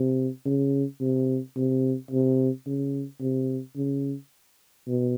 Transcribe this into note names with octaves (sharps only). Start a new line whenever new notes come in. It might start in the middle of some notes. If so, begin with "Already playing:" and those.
Already playing: C3
C#3
C3
C3
C3
C#3
C3
C#3
B2